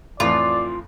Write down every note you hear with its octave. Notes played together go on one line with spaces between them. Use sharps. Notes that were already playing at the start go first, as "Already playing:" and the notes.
F2 A2 E3 F4 D5